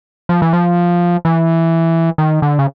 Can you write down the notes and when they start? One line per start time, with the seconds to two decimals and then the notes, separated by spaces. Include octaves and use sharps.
0.29 F3
0.42 E3
0.53 F3
1.25 E3
2.18 D#3
2.42 D3
2.59 C#3